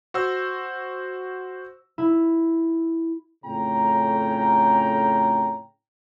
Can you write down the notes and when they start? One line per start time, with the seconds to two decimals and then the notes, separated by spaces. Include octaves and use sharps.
0.14 F#4 C5 E6
1.98 E4
3.44 F2 A2 C#3 C#4 G5 A#5